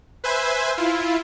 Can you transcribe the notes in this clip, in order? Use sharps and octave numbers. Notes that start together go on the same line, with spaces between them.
B4 C5 E5 G#5
E4 F4